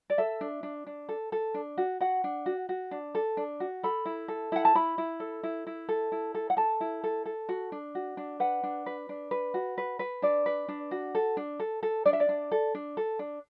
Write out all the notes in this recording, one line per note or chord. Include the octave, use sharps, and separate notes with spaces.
D5
A4 E5
D4
D4
D4
A4
A4
D4
F#4
F#4 F#5
D4
F#4
F#4
D4
A4
D4
F#4
A4 B5
E4
A4
E4 F#5
A5
E4 B5
E4
A4
E4
E4
A4
E4
A4
F#5
A4 A5
E4
A4
A4
F#4
D4
F#4
D4
B4 F#5
D4
B4
D4
B4
F#4
B4
B4
D4 D5
B4
D4
F#4
A4
D4
A4
A4
D4 D5
E5
D5
D4
A4
D4
A4
D4